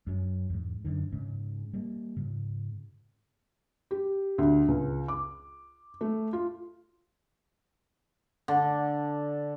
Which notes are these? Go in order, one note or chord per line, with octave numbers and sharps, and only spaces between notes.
F#2 F#3
E2 G#2
F#2 D3 D#3
G#2 C#3
G3 A#3
G#2 C#3
G4
D2
C#2
D6
A3
F4
D3